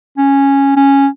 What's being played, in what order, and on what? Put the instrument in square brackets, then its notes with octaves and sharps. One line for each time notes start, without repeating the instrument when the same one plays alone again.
[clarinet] C#4
C#4